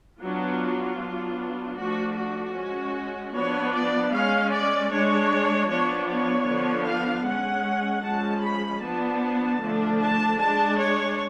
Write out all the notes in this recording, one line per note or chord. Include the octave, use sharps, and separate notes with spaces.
F#3 B3 D4 F4
F#3 B3 D4
F3 A3 D4 F#4
F#4
G#3 C#4
F3 B3 D4 C#5
D5
G#3 C#4 F5
D5
G#3 D4 C#5
F3 B3 D4 C#5
C#5
D3 F3 B3 D4
F5
G#3 C#4 F#5
F3 G#3 C#4 A5
B5
F3 B3 D4 A5
D3 F3 A3 D4
A5
G#3 D4 A5
C#5